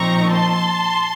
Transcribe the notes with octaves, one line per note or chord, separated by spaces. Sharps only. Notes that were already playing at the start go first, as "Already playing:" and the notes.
Already playing: A#2 F3 C4 D#4 A#5 C#6
A5 C6